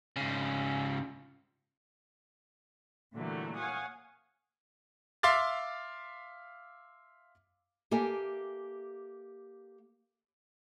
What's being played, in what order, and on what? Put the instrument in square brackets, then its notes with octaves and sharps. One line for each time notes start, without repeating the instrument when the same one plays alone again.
[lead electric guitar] G#2 C#3
[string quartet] A#2 D3 E3 F#3 G3 A3
C#5 F5 F#5 G#5 D#6
[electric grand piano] E5 F5 C6 D6 F6 A6
[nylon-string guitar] A#3 G4 A4 E5 G#5